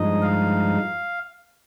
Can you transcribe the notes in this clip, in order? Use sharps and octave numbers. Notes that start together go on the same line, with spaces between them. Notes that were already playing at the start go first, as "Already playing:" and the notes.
Already playing: G2 F3 G#3 D#4 D#5
F5